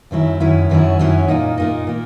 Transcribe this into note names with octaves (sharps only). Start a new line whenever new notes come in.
F#2 D#3 F#3 C#4 E4
F#2 D#3 F#3 C#4 E4
F#2 D#3 F#3 C#4 E4
F#2 D#3 F#3 C#4 E4
A#2 A#3 D#4
A#2 A#3 D#4
A#2 A#3